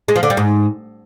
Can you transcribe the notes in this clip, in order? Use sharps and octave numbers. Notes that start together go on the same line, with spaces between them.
G#3
F3
D3
G3
G#2